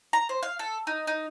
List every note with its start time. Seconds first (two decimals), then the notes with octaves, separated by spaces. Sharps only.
0.13 A#5
0.29 C5
0.43 F5
0.59 A4
0.87 D#4
1.07 D#4